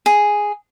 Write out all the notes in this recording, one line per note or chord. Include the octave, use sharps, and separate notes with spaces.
G#4